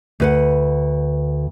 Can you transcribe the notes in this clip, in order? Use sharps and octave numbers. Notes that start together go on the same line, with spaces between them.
D2 B4 F#5